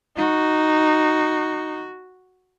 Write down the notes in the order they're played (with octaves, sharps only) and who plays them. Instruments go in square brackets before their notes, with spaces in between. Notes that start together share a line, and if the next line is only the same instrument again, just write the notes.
[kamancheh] D#4 [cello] F#4